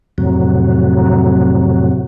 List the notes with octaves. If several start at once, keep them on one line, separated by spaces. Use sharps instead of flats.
F2 A2 C3 F#3